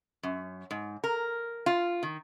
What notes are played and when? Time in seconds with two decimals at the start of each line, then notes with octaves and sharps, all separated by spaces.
0.23 F#2
0.71 G#2
1.04 A#4
1.66 F4
2.03 D#3